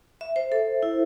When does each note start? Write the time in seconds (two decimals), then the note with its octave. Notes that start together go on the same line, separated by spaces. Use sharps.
0.21 E5
0.36 C5
0.52 A4
0.83 E4